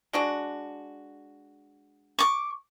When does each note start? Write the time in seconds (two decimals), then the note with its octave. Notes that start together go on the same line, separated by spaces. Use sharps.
0.13 G#3 D4 F#4
2.19 C#6 D6